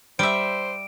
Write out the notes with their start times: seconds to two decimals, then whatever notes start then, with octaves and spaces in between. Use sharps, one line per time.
0.19 G3 C5 E5 D7